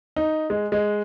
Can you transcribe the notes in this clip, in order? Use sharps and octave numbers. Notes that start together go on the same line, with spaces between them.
D#4
G#3
G#3